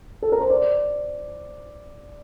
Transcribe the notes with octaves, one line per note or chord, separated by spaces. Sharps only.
A4
A#4
C5
D5